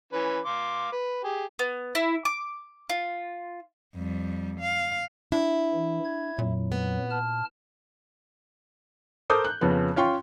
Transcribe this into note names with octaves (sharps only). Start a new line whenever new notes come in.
E3 C#4 B4
F5 C6 D6
B4
G4 G#4
B3
E4
D6
F4
F2 G3
F5
D4 E4
E3
G#6
F2 A#2 F#3
B3
A5 F6
A4 A#4 C5 D6 D#6 G6
F#6
F2 C#3 F3 B3
C#4 F4 G5 C6 C#6